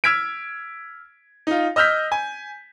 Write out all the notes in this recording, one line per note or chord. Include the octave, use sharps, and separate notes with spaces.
E6 F6 G#6 B6 D7
D#4 F4
D#5 E6 F6 G6 B6
G#5